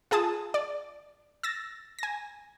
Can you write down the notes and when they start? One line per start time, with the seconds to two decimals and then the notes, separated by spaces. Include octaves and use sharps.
0.11 F4 G#4 A5 D#6
0.54 D5
1.43 E6 A6 A#6
1.99 G#5 A#6